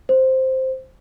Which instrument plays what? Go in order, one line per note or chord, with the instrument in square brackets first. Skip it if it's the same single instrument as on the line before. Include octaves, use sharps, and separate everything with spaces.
[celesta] C5